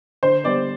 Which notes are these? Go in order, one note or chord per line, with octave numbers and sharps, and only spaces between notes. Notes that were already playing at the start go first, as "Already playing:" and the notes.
D3 C5
G3 B3 D5